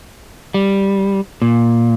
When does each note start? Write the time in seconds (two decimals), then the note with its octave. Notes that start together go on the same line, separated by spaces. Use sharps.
0.54 G3
1.42 A#2